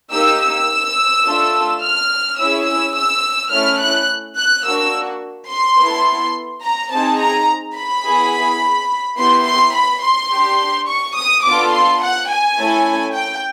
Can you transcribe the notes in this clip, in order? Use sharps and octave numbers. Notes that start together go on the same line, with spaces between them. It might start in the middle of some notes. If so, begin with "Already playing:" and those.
A#3 D#4 G4 E6
E6
A3 D4 F4 A4
F6
C#4 E4 G#4 E6
E6
E6
A3 C#4 E4 F6
F#6
F#6
A#3 D4 F#4 E6
C6
B3 E4 A4
A#5
C4 D#4 G#4 A5
A#5
B5
B3 E4 G#4
B3 E4 G4 C6
C6
B5
C6
D4 G4
C#6
D#6
B3 D4 F4 A4 D6
C6
F#5
G#5
A3 C#4 E4 A4
G5